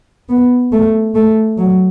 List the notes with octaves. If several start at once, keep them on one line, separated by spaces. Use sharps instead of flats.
B3
A3
A3
F#3